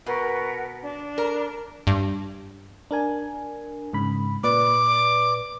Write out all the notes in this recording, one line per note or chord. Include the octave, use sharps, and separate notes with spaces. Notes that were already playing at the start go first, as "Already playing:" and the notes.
B2 A#4 B4 F#5
D4
A#4
G2
D4 A#4 G#5
G#2 C#3 B5
A#2 B4 D5 D6